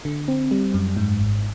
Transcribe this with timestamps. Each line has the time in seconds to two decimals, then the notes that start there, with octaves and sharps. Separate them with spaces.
0.05 D3
0.28 C4
0.51 G3
0.74 F#2
0.97 G#2
1.20 G#1